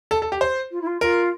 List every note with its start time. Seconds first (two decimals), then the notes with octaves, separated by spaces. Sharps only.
0.11 A4
0.22 A4
0.32 G4
0.41 C5
0.71 F4
0.81 E4
0.86 F4
1.01 F4 A#4